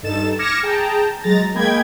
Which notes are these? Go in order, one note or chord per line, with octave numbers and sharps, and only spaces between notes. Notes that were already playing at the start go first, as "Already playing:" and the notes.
G2 D#4 A4 A6 E7
D6 F6 G#6 A#6 C#7 E7
G#4 G5 A5 A#5
F#3 G#3 A#5 A6 A#6
G#3 A#3 G#4 G5 B5 G#6